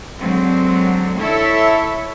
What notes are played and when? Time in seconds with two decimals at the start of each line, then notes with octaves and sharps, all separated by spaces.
0.19 D3 F#3 G#3 C4
1.19 E4 A4 C#5 E5